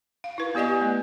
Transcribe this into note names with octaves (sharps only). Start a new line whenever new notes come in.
F5
E4 B4
B3 G4 D5 D#5 G#5
A3 B3